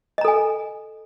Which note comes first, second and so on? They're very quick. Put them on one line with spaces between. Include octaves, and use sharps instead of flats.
D#5 A#5 A4 G#5